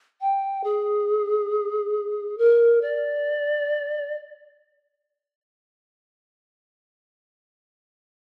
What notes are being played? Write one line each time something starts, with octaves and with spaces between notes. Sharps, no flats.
G5
G#4
A#4
D5